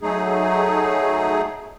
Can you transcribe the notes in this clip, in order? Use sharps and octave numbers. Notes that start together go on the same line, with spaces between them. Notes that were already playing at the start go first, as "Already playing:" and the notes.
F#3 A3 D#4 G#4